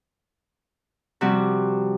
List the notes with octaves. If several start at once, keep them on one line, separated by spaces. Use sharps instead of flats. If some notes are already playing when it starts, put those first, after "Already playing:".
C3 F3 G3 F#4